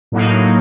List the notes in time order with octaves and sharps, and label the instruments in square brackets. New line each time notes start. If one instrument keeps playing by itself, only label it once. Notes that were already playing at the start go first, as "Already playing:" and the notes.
[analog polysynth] A2 F#3 A#3 D#4